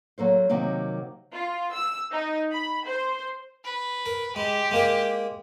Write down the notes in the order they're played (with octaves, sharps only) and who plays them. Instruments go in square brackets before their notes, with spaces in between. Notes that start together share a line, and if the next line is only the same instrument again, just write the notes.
[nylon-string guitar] F#3 A#3 A4 C5
C3 D#3 F#3 A#3 G4
[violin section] F4
E6
D#4
B5
C5
[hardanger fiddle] B4
[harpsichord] A#4
[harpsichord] G#3 [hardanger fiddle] G4
[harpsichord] G#3 A#3 A#4